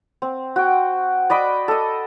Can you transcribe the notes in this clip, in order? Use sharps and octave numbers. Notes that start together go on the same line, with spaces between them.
C4
F#4 G5
D5 D#5 B5 D6
A4 D#5